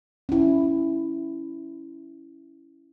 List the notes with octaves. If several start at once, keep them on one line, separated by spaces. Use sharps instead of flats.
C#4 E4